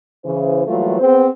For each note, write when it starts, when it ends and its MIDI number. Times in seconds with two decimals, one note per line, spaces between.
0.25 0.63 49
0.25 0.63 52
0.25 0.63 72
0.67 0.96 52
0.67 0.96 54
0.67 0.96 55
0.67 0.96 57
0.67 0.96 58
0.67 0.96 65
0.99 1.27 59
0.99 1.27 60
0.99 1.27 68
0.99 1.27 72